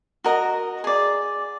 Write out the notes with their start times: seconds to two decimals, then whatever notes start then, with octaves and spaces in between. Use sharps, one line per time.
0.24 F#4 A#4 D#5
0.84 G#4 D5